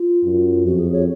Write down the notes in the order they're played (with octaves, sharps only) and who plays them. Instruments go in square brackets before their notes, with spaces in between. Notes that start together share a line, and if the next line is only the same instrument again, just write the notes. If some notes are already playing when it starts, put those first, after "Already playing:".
Already playing: [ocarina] F4
[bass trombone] F#2
[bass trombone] F2 [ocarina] F#4
[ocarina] G#4
C#5